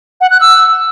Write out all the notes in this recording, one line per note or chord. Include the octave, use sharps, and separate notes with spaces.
F#5
F#6
E6